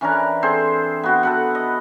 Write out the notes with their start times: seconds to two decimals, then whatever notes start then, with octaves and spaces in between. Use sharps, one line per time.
0.01 E3 C#4 D4 A#4
0.42 C4 G#4 A4 C5
1.03 B3 F#4 G5
1.23 A4 B4 F#5
1.55 D#5